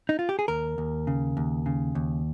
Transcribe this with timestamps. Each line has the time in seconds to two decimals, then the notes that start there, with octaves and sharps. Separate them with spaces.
0.09 D#4
0.19 F4
0.29 G4
0.39 G#4
0.48 D#2 A#4
0.78 D#2
1.07 C#3
1.37 D#2
1.66 C#3
1.95 D#2